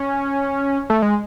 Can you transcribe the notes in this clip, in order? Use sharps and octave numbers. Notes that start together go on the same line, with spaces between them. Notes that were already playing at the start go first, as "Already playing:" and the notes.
Already playing: C#4
A3
G#3